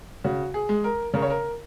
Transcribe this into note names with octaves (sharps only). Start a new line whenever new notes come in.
C#3 F#4
G#4
G#3
A#4
C#3 A#4
C#5
A#4